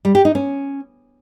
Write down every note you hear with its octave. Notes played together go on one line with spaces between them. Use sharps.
G3
G4
D#4
C#4